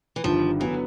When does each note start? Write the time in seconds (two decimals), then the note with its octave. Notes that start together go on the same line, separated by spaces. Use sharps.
0.16 E3
0.24 G1 G2 D#3 F3
0.60 D3 E3 F#3 B3